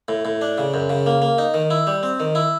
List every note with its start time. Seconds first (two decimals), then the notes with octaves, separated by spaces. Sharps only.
0.08 A2
0.25 A2
0.41 D4
0.58 C#3
0.74 F#2
0.90 C#3
1.06 A#3
1.22 A#3
1.38 D#4
1.54 D#3
1.70 E4
1.87 G3
2.03 C4
2.20 D#3
2.35 E4